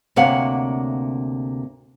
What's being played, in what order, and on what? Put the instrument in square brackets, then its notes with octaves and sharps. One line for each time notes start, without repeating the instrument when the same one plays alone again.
[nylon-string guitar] D2 C3 A#3 C#5 F5 F#5